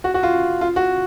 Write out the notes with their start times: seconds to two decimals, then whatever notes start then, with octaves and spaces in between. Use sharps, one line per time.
0.04 F#4
0.14 F#4
0.23 F4
0.61 F4
0.76 F#4